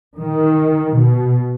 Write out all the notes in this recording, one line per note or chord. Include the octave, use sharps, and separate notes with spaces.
D#3
B2